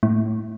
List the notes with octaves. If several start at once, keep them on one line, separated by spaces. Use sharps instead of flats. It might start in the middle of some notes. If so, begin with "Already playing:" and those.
A2